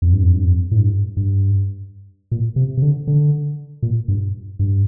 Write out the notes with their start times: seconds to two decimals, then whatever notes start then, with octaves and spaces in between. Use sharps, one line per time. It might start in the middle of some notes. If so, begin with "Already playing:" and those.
0.02 F2
0.13 G2
0.23 F2
0.34 G2
0.44 F2
0.71 A2
0.79 G2
1.17 G2
2.32 A#2
2.56 C3
2.77 C3
2.82 D3
3.07 D3
3.83 A#2
4.08 G2
4.59 G2